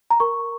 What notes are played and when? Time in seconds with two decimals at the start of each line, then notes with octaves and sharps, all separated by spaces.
0.10 A#5
0.20 A#4 C#6